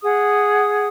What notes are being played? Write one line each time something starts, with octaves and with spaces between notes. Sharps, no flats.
G#4 F#5 D#6